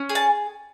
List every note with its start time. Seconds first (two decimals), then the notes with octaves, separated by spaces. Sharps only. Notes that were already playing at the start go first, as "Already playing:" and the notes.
Already playing: C#4
0.09 G#4
0.15 A5